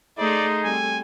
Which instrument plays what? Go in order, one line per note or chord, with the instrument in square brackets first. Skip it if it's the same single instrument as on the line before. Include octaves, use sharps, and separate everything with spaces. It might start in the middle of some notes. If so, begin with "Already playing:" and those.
[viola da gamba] A3 G#4 C5 [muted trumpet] D#4 [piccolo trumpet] D5
[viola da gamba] G3 C4 A4 [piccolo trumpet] G#5